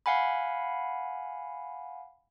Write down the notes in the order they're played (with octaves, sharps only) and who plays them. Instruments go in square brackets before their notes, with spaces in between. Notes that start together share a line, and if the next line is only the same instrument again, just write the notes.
[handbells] F5 F#5 G#5 B5